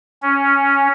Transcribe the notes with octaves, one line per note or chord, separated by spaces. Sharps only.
C#4